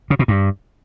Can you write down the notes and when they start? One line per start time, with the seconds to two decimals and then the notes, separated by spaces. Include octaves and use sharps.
0.10 C#3
0.19 B2
0.28 G2